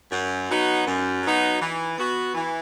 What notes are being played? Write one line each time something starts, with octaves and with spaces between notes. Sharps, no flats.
F#2
F#3 B3 D#4 F#4
F#2
F#3 B3 D#4 F#4
E3
B3 F#4
E3